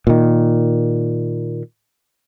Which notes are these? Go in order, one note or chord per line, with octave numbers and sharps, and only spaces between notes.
A#2 D#3